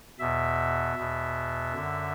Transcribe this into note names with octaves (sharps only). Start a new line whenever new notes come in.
E2 B2 E5
E2 B2
F#2 D3